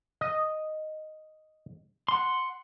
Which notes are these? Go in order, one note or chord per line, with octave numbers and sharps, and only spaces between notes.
D#5
F#5 C6